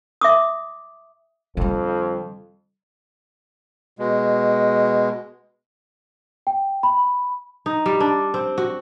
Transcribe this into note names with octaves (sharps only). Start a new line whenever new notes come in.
E5 D6 D#6
F2 D3 G3
B2 G#3
G5
B5
D#4
G3
D4
C4
F#4